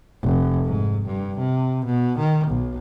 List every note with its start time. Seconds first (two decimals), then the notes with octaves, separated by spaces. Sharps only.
0.23 F1
0.65 G#2
1.06 G2
1.39 C3
1.86 B2
2.19 D#3
2.48 B1